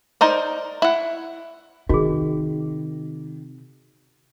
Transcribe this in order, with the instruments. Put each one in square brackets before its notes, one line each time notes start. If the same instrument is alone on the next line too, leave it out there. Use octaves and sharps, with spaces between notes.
[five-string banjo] D#4 A#4 C5 D5
E4 F#5
[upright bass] C3 [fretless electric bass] D#3 [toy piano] F#4 G#4